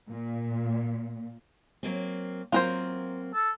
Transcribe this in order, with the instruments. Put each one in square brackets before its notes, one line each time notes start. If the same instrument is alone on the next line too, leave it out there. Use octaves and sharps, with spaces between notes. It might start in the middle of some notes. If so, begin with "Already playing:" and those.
[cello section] A#2
[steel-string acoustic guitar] F#3 A#3 C4
[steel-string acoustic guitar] F#3 A#3 C4 [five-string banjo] F4 A#4 C5
[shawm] A4